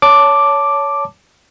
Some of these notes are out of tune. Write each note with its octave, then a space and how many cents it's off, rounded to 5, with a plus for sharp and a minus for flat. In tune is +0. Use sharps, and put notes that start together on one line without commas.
C#5 +20 A5 +0 D6 +0